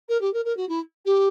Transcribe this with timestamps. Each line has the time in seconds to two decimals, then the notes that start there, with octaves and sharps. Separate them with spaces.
0.09 A#4
0.21 G4
0.33 A#4
0.45 A#4
0.57 F#4
0.69 E4
1.05 G4